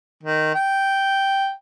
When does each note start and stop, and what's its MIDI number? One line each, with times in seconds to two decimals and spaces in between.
0.23 0.50 51
0.55 1.52 79